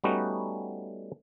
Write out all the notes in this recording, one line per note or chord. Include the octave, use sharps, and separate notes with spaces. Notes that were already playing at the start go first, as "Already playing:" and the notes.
G3 A3 B3 C#4 D#4 F#4